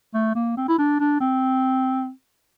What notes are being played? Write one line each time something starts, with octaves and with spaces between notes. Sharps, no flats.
A3
A#3
C4
E4
D4
D4
C4